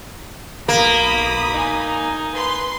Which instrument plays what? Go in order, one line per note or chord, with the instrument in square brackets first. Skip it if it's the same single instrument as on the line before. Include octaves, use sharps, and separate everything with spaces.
[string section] B1 B5 D#6 [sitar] A#3
[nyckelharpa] D#4 G#5
[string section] B4 C6